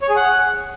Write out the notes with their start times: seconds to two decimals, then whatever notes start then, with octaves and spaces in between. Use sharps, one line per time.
0.02 C#5
0.09 G#4
0.16 F#5